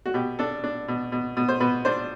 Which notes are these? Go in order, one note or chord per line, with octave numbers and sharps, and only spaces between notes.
F#4
B2 G4
D4 A4
D4
B2
B2
B2
C5
B2 B4
D4 C5